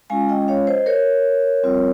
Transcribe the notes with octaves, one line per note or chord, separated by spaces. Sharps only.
G#3 C#4 F4 F5 G#5
D#5 G5
C#5 F5
C5 D#5
A#4 C#5
G3 C4 F4